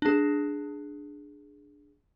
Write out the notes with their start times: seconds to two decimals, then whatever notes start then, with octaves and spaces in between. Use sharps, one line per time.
0.02 D4 G#4